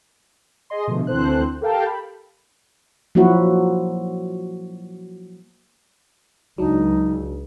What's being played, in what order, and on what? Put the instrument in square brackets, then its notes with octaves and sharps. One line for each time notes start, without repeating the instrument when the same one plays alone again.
[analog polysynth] G#4 D#5 C6
B2 D3 F3 A3
D2 E3 C4 A4 C5 F#6
G4 A4 A#4 F5 G5 A5
B5
[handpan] F3 F#3 A#3 E4 F#4
[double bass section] C#2 [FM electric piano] F#3 D4 [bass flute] D#4